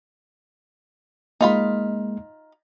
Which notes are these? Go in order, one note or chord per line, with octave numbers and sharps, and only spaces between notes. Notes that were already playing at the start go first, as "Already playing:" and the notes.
G#3 A#3 D#4 F4 B5